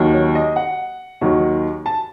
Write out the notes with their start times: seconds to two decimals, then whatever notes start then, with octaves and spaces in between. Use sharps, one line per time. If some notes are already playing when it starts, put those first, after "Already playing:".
Already playing: D#2 D#3 F#3
0.14 C#5
0.35 D#5
0.56 F#5
1.21 D#2 D#3 F#3
1.86 A5